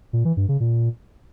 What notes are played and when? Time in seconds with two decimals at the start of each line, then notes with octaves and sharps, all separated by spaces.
0.13 A#2
0.25 E3
0.37 G2
0.49 C#3
0.60 A#2